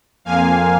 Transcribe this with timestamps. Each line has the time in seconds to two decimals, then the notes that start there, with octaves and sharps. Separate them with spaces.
0.25 F2 F3 A#3 F5 G#5